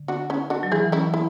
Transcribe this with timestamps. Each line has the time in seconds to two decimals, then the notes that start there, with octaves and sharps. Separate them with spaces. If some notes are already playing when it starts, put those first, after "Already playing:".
Already playing: D3
0.08 D4 F#4
0.30 C#4 E4
0.50 D4 F#4
0.63 F#3
0.72 E3 E4 G#4
0.92 C#4 E4
1.14 E4